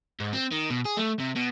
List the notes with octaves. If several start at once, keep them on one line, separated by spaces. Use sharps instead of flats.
G#2
C4
D#3
B2
G#4
A3
C3
B2